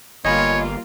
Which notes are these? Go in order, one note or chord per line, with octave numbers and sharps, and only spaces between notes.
G1 G3 A#3 F4 C#5 D#5 G#5 B5